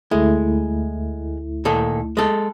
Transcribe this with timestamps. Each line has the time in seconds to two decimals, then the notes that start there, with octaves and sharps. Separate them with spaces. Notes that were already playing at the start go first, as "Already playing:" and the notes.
0.11 D2 G#3 A3 E4
1.65 A#2 D#3 A4
2.17 G#3 A4